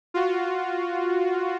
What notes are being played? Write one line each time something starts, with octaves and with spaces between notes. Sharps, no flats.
F4 F#4